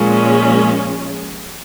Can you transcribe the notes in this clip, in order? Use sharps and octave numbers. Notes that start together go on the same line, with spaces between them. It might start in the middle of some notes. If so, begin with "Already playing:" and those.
Already playing: A#2 F3 G#3 C#4